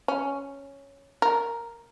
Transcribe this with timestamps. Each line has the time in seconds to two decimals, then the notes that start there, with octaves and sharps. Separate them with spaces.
0.08 C#4
1.22 A#4